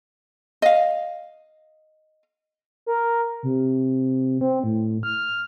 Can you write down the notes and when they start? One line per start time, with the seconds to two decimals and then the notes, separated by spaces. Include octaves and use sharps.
0.62 D#5 F5
2.86 A#4
3.43 C3
4.41 C4
4.64 A2
5.03 F6